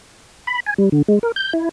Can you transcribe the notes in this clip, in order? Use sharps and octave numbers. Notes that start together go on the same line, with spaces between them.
B5
G#5
G3
D3
G#3
A#4
G6
E4